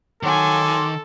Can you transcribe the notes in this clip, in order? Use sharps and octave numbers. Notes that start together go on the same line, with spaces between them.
D#3 F#3 A4 G#5 C6 D6